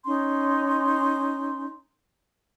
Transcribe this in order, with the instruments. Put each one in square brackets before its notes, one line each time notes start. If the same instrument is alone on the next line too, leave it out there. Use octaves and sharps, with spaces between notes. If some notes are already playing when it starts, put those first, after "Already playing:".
[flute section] C#4 D#4 C6